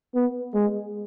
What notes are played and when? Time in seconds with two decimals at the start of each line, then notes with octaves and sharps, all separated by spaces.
0.15 B3
0.54 G#3